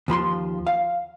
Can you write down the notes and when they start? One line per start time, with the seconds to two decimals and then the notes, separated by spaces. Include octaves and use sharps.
0.08 D#2 F3 B5 C6
0.67 F5